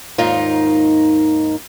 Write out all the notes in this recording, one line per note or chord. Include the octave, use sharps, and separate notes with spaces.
D#2 G#2 D#3 D#4 F4